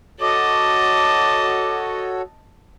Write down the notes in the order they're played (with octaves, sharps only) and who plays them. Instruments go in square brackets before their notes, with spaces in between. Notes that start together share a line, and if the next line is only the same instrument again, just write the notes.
[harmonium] F#4 A4 C#5 [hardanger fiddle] D#5 A5 [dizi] D6